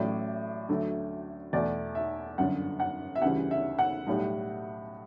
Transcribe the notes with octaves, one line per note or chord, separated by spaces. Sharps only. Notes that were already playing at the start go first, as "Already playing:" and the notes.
Already playing: A1 A2 F#3 A3 D5
D2 D3 F#3 A3
E2 B2 A3 D5
E5
G1 F#2 D3 F#5
F#5
E5
D2 C#3 E3 G3 F#5
E5
F#5
B1 A2 G3